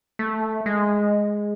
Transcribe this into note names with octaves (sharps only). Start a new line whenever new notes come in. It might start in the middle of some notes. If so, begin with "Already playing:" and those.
A3
G#3